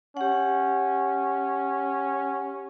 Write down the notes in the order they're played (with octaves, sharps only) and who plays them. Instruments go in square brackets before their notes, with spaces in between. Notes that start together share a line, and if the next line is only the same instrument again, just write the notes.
[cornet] C#4 [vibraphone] G4 F#5